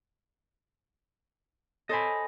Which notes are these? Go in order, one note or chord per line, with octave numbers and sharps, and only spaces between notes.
A4 C5 D#5 G#5 B5